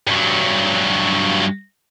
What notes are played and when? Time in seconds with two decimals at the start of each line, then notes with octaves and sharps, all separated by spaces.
0.07 G2 F#3